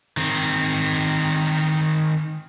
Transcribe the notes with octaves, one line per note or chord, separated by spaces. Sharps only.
D#3 C4